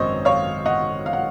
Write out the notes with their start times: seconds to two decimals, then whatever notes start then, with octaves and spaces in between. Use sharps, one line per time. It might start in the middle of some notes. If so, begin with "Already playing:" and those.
Already playing: G#1 F#2 D#3 C5 C#5 D#5
0.25 C#5 F5
0.66 D#5 F#5
1.06 F5
1.13 F#5